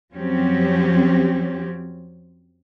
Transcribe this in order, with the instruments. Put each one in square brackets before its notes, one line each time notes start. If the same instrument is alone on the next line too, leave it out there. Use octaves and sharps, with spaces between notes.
[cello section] F2 F3 F#3 C4 C#4 G4